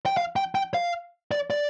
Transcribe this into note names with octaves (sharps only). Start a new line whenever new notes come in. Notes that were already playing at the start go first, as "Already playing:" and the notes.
G5
F5
G5
G5
F5
D5
D5